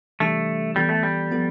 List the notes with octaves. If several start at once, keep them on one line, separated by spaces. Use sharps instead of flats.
C3 E3 G3 A3 D4 G4
E3 G3 B3 F4 A4
A3
G3
F3 B3 F4 A4